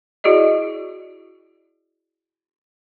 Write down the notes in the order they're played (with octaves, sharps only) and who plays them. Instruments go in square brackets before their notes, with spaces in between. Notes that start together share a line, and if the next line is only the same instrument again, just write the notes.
[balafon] E4 F#4 G#4 D5 D#5